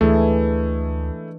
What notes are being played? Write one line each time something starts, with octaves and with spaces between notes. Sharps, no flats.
D2 E3 G#3 A3 D4 E4 G#4